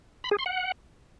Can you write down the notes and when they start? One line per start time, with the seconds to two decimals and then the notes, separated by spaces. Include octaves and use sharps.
0.24 B5
0.31 G#4
0.39 C6
0.46 F#5